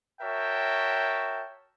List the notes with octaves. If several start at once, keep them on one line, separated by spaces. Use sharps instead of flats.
F#4 A#4 C#5 E5 G5 A5